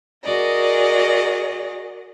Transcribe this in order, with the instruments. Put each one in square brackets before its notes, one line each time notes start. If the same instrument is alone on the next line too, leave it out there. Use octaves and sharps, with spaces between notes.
[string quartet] F#4 G#4 A#4 D5 D#5